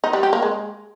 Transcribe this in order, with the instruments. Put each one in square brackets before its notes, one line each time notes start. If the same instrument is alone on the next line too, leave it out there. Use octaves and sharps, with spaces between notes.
[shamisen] D#4
G3
G4
A#3
G#3